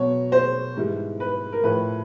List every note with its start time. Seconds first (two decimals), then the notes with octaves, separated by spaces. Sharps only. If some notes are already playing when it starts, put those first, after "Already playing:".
Already playing: B2 F#3 C#5
0.32 C5
0.77 G#2 E3 G3
1.20 B4
1.52 A#4
1.63 A2 F3 B4